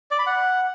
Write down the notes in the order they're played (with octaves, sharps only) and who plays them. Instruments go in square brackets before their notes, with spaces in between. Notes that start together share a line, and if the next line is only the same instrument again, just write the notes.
[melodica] D5
B5
F#5